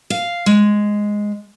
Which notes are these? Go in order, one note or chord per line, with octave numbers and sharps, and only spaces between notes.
F5
G#3